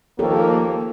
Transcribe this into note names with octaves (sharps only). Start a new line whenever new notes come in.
D#2 F3 A#3 G4 A4 C#5